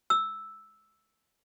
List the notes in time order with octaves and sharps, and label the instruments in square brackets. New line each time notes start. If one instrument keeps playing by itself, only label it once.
[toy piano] E6